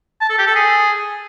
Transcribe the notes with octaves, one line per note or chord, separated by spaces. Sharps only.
A5
A4
G4
A4
G#4